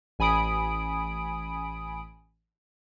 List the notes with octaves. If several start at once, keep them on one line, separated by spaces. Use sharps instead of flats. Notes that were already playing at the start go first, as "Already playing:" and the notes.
A1 G#5 B5 D#6 D7